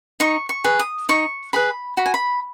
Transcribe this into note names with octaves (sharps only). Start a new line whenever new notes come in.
D#4 C#6
C#6
G#4 B4
D#6
D#4 C#6
G#4 B4 B5
F#4 B5
G#5
B5